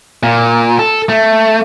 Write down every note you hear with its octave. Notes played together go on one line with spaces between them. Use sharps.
A#2
A4
A3